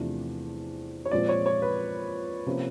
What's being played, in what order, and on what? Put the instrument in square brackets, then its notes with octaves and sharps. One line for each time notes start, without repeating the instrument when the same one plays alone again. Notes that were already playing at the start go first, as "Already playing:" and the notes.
Already playing: [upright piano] E2 C3 F3 A3 D4
C#5
A#2 F3 G#3 C4 D5
C#5
C#5
B4
C3 F3 A#3 C#4